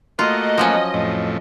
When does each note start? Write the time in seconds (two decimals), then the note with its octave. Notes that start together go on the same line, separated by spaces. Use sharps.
0.19 A3 A#3 F4 F#4 D#5
0.58 F3 F#3 C#4
0.94 F2 A2